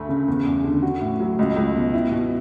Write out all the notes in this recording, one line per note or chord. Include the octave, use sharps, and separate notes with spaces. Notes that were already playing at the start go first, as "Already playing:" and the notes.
Already playing: D2 A3
C#3
E2
E2
D3
F#4
A2
F#3
C#2
C#2
B2
E4
B2